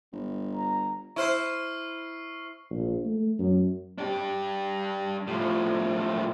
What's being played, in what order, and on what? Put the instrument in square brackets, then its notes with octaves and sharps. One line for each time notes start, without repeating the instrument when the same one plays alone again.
[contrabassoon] G1
[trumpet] A#5
[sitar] E4 C5 [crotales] C#6 F6 C7
[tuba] A#1
A3
F#2
[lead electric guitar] D4 G4
A2 F3